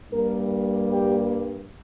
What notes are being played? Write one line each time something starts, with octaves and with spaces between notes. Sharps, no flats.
G2 G3 A#3 A#4
G4